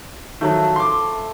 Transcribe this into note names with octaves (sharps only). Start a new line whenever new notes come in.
D#3 F3 F#3 A3 A4
C6 D6